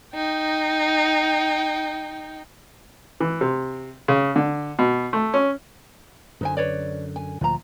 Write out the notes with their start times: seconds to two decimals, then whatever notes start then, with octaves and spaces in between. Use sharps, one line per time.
0.13 D#4 G5
3.20 E3
3.41 C3
4.08 C#3
4.36 D3
4.79 B2
5.13 A3
5.34 C#4
6.41 F#2 D3 D#4 C5 G#5
6.57 B4 C#5 D5
7.16 G#5
7.41 D2 A#2 F3 F4 A#5